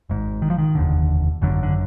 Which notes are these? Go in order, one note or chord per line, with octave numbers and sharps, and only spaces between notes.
G#1 G#2
D#3
F3
D#3
F1 D#2 D3
G#1 F#2 D3
D3